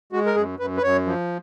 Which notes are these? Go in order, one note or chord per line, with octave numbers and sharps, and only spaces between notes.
G#3 F#4
A#4
F#2 G#4
F#2 B4
B4
F#2 C#5
F3